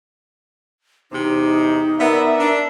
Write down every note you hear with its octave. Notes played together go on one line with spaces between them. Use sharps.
E2 C3 D#4
B3 A#4 D5 E5
D4